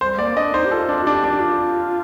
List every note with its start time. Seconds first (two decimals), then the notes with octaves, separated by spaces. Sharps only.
0.01 G3 C5
0.19 A#3 D5
0.36 D4 D#5
0.54 D#4 C5
0.65 G4
0.71 F4 A4
0.89 D4
1.06 D4 G4
1.24 D4
1.41 F4